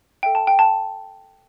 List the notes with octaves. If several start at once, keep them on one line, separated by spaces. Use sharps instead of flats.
A4 E5 G5
A5
G5
A5